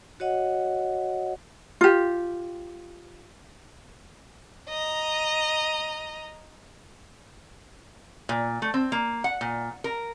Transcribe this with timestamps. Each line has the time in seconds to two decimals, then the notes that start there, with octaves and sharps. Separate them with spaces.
0.20 F#4 C#5 D#5 F#5
1.81 F4 G4
4.69 D#5 A#5
8.29 A#2
8.62 A3
8.74 C4
8.92 A#3
9.24 F#5
9.41 A#2
9.84 A#4